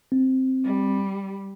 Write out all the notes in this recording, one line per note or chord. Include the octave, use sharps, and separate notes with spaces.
C4
G3